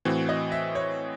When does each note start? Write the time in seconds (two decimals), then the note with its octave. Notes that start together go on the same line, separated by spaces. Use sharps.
0.05 A2 E3 C4 F#4
0.29 D#5
0.52 E5
0.75 C#5